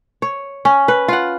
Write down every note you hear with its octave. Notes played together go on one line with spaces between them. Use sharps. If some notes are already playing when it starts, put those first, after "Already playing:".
C#5
C#4
B4
F4 F#5